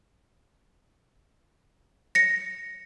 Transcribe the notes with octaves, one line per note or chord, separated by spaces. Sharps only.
A#6 C#7